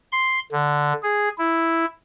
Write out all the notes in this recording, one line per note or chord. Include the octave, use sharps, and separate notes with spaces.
C6
D3
G#4
E4